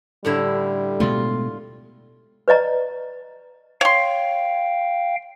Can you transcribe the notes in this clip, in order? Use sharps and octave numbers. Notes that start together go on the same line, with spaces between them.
A2 D3 G3 E4
B2 G#3 A3 F4
B4 D5 D#5 A#5
C#5 F5 G5 C6